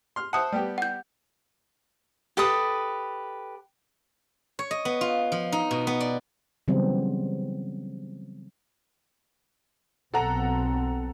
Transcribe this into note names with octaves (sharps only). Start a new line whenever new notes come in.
C6 F6
C5 E5 F#5 A5 D#6
G3 B3 G4
F#5 G6
G4 A4 B4 D#6
C#5
D#5
B3
F4
F3
D#4
B2
B3
D5
C#3 E3 F#3 G3 B3 C4
B1 C4 A4 F#5 A#5